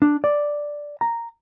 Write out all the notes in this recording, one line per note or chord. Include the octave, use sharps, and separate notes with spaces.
D4
D5
A#5